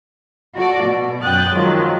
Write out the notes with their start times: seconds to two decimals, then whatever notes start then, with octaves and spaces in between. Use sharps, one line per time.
0.56 F#4 A4 D5
0.85 B2
1.23 F#2 G5 D#6 F#6 A6
1.54 D#3 F3 F#3 G#3